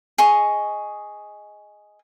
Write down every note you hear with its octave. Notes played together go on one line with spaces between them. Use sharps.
G#4 D#5 C#6